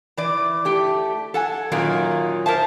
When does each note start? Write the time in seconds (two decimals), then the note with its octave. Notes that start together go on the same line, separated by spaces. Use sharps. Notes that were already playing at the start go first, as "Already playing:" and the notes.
0.17 E3 D5
0.65 A3 G4
1.34 A4 F#5 G#5
1.72 F#2 A#2 D#3 F#3 A#3 D#4
2.46 A#4 C5 E5 A5